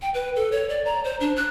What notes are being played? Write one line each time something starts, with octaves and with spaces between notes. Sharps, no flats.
G5
B4
A4
C#5
D5
A#5
C5
D4
F#6